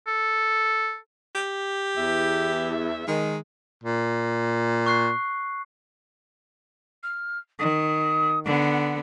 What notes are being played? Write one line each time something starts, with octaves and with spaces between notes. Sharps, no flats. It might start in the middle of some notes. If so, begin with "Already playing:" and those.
A4
G4
E2 E5
D#3 G#3
A#2
C#6 F#6 C7
F6
D#3 D#6
D3 B3 F#5